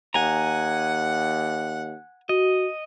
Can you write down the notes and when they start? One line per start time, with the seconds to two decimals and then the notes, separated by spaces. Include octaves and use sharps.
0.14 D#2 F#5 G#5 A#5
2.29 F#4 D#5